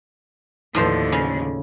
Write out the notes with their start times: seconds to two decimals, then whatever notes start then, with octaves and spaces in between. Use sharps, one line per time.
0.75 D#2 A2 D3 F3 C5
1.12 C#3